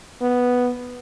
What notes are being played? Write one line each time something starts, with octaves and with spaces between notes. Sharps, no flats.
B3